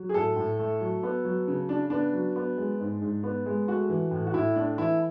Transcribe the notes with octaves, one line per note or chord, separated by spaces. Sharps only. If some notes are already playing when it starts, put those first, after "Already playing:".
Already playing: F#3
G#4
A2 A4
A2
A3
F#3
B3
F#3
C#3
C#3 D4
B3 D4
F#3
B3
G#3
G#2
G#2
B3
G#3
A3 F#4
E3
A2
F#4
A2 E4
A3 D4
E3 E4